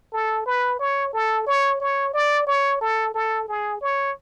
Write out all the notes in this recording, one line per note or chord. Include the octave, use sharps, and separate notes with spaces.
A4
B4
C#5
A4
C#5
C#5
D5
C#5
A4
A4
G#4
C#5